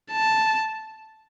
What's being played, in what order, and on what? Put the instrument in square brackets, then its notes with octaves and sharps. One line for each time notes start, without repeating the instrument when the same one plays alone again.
[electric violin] A5